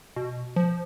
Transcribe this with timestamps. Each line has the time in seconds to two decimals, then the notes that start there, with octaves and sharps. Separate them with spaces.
0.16 B2
0.56 F3